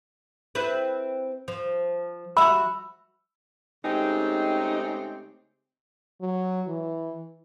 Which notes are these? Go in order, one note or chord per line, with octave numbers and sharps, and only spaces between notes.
C4 E4 B4
F3
F#4 E5 B5 E6
C#3 G#3 A3 C4 D#4 G4
F#3
E3